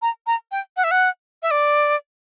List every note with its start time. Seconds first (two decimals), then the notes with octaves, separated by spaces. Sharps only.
0.02 A#5
0.27 A#5
0.52 G5
0.77 F#5
0.84 E5
0.91 F#5
1.42 E5
1.51 D5